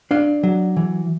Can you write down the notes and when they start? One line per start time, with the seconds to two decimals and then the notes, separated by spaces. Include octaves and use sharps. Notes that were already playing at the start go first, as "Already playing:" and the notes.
0.11 D4 F5
0.43 F#3
0.77 E3